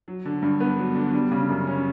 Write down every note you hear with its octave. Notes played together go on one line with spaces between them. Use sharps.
F#3
D3
G2
B3
F#3
D3
G3
C#3
F#2
C#4